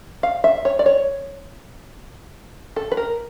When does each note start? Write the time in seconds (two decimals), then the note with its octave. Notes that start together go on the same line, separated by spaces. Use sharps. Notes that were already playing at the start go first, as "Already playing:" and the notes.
0.23 F5
0.44 E5
0.65 C#5
0.79 D5
0.86 C#5
2.76 A4
2.92 B4
2.97 A#4